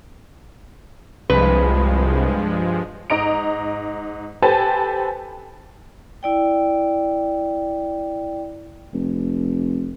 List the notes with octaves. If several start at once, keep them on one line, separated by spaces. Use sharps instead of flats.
C2 G2 F3 G#3 B4
G#2 D#5 A#5 D7
G4 A4 B4 C5 G#5 A5
E4 D5 G5
F1